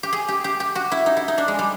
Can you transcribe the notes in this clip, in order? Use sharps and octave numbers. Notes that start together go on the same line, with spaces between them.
G4
G#4
G4
G4
G4
F#4
E4
D#4
E4
D#4
D4
G#3
G3